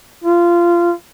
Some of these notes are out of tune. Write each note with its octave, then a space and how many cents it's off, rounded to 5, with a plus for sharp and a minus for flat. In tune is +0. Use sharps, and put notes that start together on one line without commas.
F4 -20